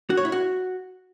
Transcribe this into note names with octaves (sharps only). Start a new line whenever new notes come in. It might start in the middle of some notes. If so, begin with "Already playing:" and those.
F#4
C#5
E4
F#4